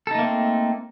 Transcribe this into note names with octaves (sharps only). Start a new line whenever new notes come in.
A3 A#3 C4 D#4 A4